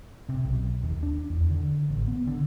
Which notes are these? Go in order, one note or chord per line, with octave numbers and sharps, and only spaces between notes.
C3
B1
D#2
D4
E2
D3
A1
B3
D3